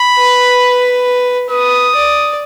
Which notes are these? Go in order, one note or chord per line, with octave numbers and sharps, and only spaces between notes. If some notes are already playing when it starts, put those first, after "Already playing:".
Already playing: B5
B4
B4 D#6
D5